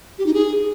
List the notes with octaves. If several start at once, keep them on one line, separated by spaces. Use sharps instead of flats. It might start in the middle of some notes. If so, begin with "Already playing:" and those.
G4
D#4
G#4